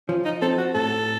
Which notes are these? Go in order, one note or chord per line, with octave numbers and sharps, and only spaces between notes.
F3 C#4
D#4
C4 A4
F#4
A2 A4